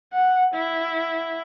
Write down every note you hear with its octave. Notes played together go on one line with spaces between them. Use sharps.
F#5
E4